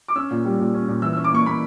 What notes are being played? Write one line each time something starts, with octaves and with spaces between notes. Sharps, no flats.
D6
C#4 E6
A#2
G3
A#2
C#4
A#2
E3 E6
C#4 E6
D6
A#3 C#6
A#3 B5